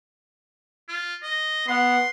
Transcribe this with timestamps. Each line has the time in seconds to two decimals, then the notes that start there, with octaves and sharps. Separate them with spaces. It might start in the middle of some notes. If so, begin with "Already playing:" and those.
0.89 F4
1.23 D#5
1.68 B3 F#5 C6